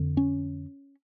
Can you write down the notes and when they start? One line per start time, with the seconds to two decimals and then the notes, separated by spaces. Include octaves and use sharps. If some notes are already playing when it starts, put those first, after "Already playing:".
Already playing: F2 D3
0.17 C#4